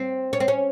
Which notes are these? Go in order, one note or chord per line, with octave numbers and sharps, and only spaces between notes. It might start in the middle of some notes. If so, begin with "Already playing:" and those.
Already playing: C4
C#4
C4
C#4